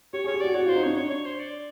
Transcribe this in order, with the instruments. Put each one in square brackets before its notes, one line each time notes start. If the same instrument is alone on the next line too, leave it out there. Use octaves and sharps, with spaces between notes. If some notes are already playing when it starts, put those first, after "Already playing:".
[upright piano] G4 [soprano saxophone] C#5
[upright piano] G#4 [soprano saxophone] C#5
[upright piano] G4
[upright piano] F#4 [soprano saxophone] D5
[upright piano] F#4 [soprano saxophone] C#5
[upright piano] F4 [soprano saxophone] C5
[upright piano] D#4
[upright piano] D4 [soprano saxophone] C#5
[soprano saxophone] C#5
C#5
C5
D5